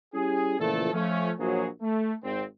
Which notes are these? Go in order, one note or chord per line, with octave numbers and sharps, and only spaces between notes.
G3 C#4 E4 G4 G#4
A#2 C#3 E3 F3 A3 A4
F3 A3 C#4
A#1 F#3 G#4
A3
G#1 C4